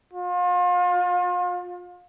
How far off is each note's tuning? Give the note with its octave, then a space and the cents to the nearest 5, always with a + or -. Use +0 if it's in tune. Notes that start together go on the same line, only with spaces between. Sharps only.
F4 +35